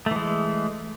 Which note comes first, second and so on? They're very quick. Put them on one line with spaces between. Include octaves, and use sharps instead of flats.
A3 E3 G#3